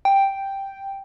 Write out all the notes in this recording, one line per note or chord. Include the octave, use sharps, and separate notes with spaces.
G5